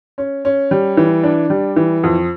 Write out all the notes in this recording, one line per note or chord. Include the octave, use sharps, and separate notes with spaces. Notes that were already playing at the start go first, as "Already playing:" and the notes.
C#4
C#4
G3
E3
D4
G3
E3
F2